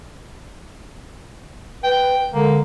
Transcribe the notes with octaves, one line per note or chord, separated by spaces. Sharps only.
B4 G5
D3 G#3 A#3